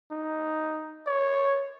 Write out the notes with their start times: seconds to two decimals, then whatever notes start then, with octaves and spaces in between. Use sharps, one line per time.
0.11 D#4
1.07 C#5